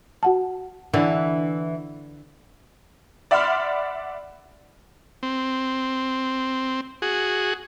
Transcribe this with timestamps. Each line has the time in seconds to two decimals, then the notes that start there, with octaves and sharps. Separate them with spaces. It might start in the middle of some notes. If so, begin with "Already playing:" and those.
0.23 F#4 F#5 A5
0.94 D3 E3
3.31 D5 E5 F#5 B5 C6 F6
5.23 C4
7.02 F#4 G#4